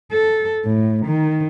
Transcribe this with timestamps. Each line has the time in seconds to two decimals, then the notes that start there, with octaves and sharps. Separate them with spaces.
0.12 A4
0.64 A2
1.06 D#3